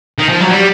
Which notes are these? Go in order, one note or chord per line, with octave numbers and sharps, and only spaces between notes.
D#3
F3
F#3
G3